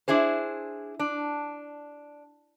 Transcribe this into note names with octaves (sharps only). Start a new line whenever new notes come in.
D4 E4 G#4 C5
D4